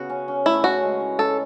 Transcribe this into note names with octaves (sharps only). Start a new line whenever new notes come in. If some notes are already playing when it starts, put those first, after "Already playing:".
Already playing: C#3 B3 F#4
C#4
C#4
A3 E4
C#4 F#4
G#3
E4
C#4 A4